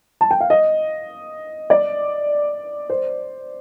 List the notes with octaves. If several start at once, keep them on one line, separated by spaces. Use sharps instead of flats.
A5
G5
F5
D#5
D5
C5